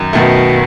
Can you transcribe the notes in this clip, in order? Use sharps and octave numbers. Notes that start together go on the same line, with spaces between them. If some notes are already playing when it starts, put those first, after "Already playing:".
Already playing: F#2 D#3
F#2 B2 D#3 A3